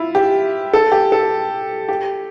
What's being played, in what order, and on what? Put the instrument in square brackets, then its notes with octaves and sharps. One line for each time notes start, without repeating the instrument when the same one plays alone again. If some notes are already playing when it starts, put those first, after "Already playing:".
Already playing: [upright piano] E4 F4
G4
A4
G4
A4
G4